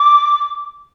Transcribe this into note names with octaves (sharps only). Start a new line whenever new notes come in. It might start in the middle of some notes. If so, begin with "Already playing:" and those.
Already playing: D6